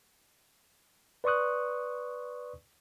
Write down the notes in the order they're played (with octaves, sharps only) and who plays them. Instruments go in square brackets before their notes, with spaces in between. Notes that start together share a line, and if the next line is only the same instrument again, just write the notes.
[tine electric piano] B4 D5 C6 C#6 D#6 F#6